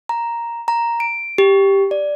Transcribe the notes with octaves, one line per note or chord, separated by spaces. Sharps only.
A#5
A#5
D7
G4
D5